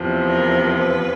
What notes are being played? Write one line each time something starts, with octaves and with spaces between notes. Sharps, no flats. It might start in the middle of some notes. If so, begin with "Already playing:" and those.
Already playing: E2 C3 F3
A#4
B4